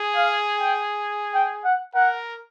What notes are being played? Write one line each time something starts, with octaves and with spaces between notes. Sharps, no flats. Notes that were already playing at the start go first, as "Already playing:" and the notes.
Already playing: G#4
F5
G5
G5
F#5
A#4 F#5